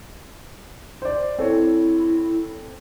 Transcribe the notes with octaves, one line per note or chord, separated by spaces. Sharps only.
C5 D5
C4 E4 A4 C#5